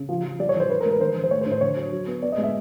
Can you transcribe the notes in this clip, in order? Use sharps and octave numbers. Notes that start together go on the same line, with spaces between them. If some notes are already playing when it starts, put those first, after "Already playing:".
Already playing: C#3
F3
F3
G3 D5
C#5
E3
C5
E3 B4
A#4
G#3
B4
D#3 C5
D#3
C5
A3 C#5
C5
A2
C5
D3 C#5
F#3
F#3
B3
B3 D5
D#5
G#3
E5